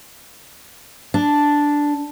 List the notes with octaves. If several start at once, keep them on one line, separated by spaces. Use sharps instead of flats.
D4